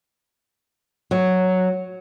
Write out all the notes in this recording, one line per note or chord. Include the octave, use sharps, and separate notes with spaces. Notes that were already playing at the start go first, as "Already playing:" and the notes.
F#3